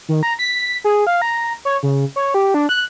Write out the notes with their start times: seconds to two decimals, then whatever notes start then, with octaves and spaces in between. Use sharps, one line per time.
0.09 D#3
0.23 A#5
0.39 B6
0.84 G#4
1.07 F5
1.22 A#5
1.65 C#5
1.83 C#3
2.16 C#5
2.34 G4
2.54 D4
2.69 F#6